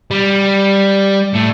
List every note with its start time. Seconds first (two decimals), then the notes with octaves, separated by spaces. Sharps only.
0.11 G3
1.34 A2